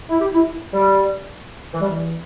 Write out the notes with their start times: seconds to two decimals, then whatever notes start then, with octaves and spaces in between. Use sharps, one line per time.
0.09 E4
0.21 G4
0.34 E4
0.73 G3
1.73 E3
1.81 G3
1.89 E3